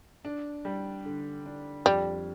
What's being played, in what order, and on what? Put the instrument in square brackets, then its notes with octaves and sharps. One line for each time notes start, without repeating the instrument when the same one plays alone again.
[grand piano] D4
G3
D3
D4
[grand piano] F2 [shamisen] G3